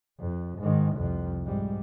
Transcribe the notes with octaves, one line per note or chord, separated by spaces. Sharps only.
F2
G#2 D#3
C2 F2
G#2 G3